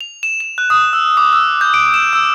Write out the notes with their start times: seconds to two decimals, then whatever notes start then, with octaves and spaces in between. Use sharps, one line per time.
0.01 F7
0.23 E7
0.40 E7
0.58 F#6
0.70 D#6
0.93 E6
1.17 D6
1.33 E6
1.61 G6
1.74 D7
1.94 E7
2.13 E6